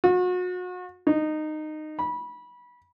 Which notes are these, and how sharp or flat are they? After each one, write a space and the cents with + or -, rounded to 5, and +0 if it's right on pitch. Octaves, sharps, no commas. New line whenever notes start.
F#4 -35
D#4 -15
B5 -20